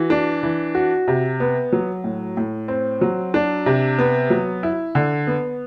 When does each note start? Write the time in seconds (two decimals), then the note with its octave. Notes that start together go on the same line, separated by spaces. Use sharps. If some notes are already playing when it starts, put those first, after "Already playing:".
Already playing: E3 F#4
0.10 D4
0.43 E3
0.75 F#4
1.08 C3
1.40 B3
1.73 F#3
2.04 A2
2.37 A2
2.68 C4
3.01 F#3
3.34 D4
3.66 C3
3.99 B3
4.30 F#3
4.63 E4
4.95 D3
5.27 B3